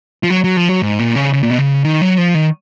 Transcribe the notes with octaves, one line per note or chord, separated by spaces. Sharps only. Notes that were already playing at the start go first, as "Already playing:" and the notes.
F3
F#3
F#3
F3
F#3
G#2
A#2
C#3
C#3
A#2
B2
C#3
D#3
F#3
F3
D#3